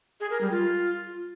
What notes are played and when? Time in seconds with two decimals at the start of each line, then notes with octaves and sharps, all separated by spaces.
0.20 G#4
0.31 A#4
0.41 G3
0.51 F4